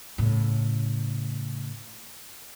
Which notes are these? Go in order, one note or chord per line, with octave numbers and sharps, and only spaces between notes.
A2 C#3